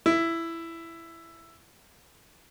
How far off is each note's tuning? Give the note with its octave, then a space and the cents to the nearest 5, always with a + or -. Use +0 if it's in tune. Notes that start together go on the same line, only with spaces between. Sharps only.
E4 +10